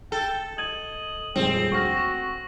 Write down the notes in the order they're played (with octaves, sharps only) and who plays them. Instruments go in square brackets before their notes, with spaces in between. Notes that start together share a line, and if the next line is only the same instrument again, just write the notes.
[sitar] A4 [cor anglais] G5
[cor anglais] D#5 [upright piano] G#6 [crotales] D#7 F#7
[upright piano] D#1 F2 G#3 [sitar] C4
[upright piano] D2 F6 [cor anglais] F#4 [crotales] C#6 A#6
[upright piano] E7